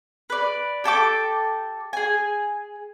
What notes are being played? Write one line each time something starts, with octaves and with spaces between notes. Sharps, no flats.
B4 D5
G4 A4 G5 D6
G#4 G#5